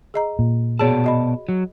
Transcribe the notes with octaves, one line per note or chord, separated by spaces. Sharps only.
G#4 D#5 A#5
A#2
B2 G#4 C#5 D5 A5
F#4 D#5 B5
F#3